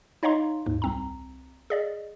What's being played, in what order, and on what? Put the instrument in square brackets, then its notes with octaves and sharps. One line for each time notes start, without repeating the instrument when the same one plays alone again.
[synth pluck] D#4 C#5 D#5 F5 A#5 C6
D#2 G#2
C2 C4 A#5
G#4 D5 D#5